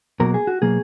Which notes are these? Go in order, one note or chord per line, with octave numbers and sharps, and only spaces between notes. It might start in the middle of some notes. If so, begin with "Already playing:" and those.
B2 F#3 A#3 A#4
G#4
F#4
B2 F#3 A#3 G#4